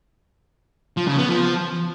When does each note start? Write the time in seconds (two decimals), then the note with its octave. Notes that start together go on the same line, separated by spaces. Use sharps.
0.97 F3
1.07 C#3
1.18 B3
1.29 F3